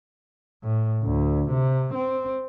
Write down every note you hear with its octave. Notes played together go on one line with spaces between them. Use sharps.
A2
D2
C3
C4